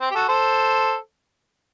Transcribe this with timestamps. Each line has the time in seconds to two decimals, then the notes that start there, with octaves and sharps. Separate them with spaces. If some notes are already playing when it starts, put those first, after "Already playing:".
0.01 C4
0.11 G4
0.15 F#4 A4
0.29 A4 C5